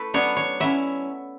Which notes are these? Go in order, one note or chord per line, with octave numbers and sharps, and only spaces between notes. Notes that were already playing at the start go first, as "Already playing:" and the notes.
Already playing: A3 E4 A4 B4
F#3 B3 D4 C#5
C#5
F#3 C#4 E4 E5